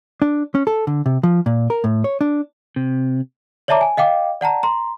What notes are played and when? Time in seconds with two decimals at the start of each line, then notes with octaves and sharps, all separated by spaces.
0.22 D4
0.55 C#4
0.67 A4
0.87 D3
1.06 C3
1.23 F3
1.46 A#2
1.70 A#4
1.84 A2
2.04 C#5
2.21 D4
2.76 C3
3.68 C#5 D5 E5 A5 A#5 D6
3.81 G#5
3.97 D#5 F5 G5 D6
4.41 D5 F#5 A5 A#5
4.63 A#5 C6